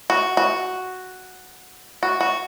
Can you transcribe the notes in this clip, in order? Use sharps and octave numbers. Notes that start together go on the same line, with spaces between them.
F#4
F#4
F#4
F#4